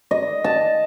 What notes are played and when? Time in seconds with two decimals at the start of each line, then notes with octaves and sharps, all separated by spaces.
0.11 D#5
0.44 A5